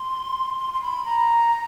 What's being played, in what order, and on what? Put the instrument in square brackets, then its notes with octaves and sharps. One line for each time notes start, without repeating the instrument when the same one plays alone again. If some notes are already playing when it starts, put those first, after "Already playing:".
Already playing: [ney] C6
C6
C6
B5
A#5